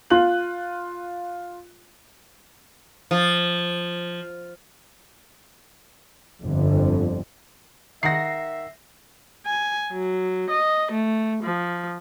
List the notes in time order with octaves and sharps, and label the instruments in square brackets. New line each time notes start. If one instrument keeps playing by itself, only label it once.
[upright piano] F4 F#6 F#7
[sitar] F3
[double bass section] G1 F2 D3
[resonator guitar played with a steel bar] D#3 F#5 [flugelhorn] E5 [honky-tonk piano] A#6 C7
[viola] G#5
F#3
D#5
A3
F3